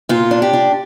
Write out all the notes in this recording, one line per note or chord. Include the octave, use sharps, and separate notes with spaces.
A#2 F4
D4
G4
D4